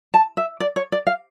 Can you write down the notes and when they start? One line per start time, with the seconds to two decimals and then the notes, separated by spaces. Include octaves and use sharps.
0.14 A5
0.37 E5
0.60 D5
0.76 C#5
0.92 D5
1.07 F5